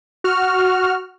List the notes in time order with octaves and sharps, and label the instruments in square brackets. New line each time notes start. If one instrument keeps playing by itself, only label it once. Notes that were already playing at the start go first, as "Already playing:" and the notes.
[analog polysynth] F#4 F6